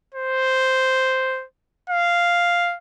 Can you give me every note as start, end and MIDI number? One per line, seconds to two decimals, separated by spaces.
0.15 1.45 72
1.90 2.76 77